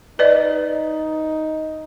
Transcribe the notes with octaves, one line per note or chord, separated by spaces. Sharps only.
D#4 B4 D5 D#5